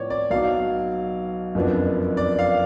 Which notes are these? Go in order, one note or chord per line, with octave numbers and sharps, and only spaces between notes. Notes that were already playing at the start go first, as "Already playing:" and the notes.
Already playing: A2 F3 B3 C#5 D5
D5
B1 B2 F#3 F5
F#1 F2 F3 B3 D4
D5
F5